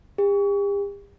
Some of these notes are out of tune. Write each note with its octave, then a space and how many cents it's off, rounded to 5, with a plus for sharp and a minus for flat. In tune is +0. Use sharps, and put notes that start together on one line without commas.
G4 +45